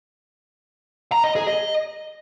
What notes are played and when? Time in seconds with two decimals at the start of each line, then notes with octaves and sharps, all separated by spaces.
1.12 A#5
1.24 D#5
1.36 G#4
1.47 D#5